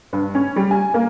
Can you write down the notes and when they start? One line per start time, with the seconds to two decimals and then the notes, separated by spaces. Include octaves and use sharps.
0.13 G2
0.35 C#4
0.56 G3
0.71 G#5
0.94 A#3